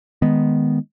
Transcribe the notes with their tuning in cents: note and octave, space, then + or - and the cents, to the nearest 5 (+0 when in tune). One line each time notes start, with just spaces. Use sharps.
D#3 +0 G#3 +0 B3 +0